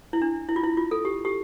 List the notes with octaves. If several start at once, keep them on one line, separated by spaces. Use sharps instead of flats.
E4
D4
E4
F4
E4
F4
A4
G4
G4